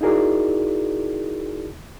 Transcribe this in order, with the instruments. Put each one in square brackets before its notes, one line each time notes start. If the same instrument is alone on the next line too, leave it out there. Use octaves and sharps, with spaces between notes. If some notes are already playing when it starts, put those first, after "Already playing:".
[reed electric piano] D#4 E4 F#4 G#4 A#4 D5